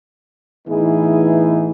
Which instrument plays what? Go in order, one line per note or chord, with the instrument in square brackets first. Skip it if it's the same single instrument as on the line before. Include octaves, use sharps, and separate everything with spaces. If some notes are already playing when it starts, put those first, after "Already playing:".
[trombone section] A2 E3 B3 D#4 E4 G#4